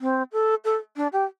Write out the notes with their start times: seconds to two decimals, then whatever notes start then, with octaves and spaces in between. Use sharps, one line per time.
0.01 C4
0.32 A4
0.65 A4
0.96 D4
1.13 G4